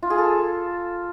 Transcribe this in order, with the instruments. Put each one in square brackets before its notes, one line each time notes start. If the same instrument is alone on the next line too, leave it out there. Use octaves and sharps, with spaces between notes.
[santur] F4
G#4
A4